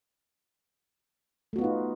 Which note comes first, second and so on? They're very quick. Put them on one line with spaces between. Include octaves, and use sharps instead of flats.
A3 F#4 B3 F4 D#4